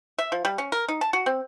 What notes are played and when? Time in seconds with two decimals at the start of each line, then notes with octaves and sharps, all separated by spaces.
0.19 E5
0.32 F3
0.45 G3
0.58 C#4
0.72 A#4
0.88 D#4
1.01 A5
1.13 F#4
1.26 C4